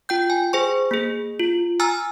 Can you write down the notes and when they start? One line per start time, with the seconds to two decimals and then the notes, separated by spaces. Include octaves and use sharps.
0.09 F4 G5 G6
0.30 G#5
0.53 G#4 C5 C#6
0.91 A#3 G#4
1.39 F4
1.80 G#5 A#5 E6 F6 A6